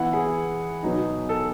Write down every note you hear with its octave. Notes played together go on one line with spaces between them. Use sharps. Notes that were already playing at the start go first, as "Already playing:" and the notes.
Already playing: E3 B3 E4 F#5
G#4
B2 F#3 B3 D#4
A4